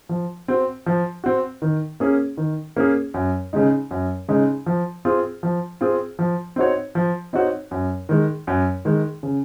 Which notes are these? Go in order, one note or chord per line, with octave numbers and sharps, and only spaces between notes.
F3
C4 F#4
F3
C4 F#4
D#3
A#3 C#4 G#4
D#3
A#3 C#4 G#4
F#2
C#3 G#3 D#4
F#2
C#3 G#3 D#4
F3
C4 F4 G#4
F3
C4 F4 G#4
F3
C4 D#4 F#4 C#5
F3
C4 D#4 F#4 C#5
F#2
D#3 G#3
F#2
D#3 G#3
C#3